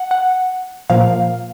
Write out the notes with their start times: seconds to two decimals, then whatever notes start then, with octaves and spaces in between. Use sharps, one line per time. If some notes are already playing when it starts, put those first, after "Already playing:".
Already playing: F#5
0.11 F#5
0.90 A#2 F3 A#3 F5